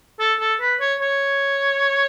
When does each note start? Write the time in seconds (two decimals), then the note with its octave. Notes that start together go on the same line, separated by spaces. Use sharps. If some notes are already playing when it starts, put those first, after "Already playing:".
0.20 A4
0.40 A4
0.61 B4
0.80 C#5
1.00 C#5